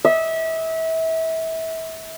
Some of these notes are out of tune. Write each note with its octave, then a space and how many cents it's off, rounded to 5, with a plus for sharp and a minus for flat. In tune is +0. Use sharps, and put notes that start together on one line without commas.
E5 -30